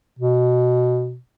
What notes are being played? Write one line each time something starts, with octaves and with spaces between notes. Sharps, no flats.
B2